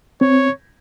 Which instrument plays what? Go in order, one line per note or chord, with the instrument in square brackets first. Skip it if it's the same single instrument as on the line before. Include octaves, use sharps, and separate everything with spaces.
[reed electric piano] C4 [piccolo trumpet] C#5